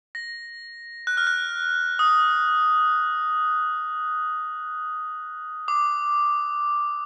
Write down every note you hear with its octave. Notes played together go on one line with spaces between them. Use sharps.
A#6
F#6
F6
F#6
D#6
D6